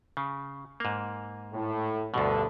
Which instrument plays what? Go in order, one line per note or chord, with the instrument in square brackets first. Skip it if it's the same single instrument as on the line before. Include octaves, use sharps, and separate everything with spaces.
[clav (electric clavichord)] C#3
G#2 A#3
[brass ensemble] A2
[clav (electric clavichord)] D2 B2 [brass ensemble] G2 D3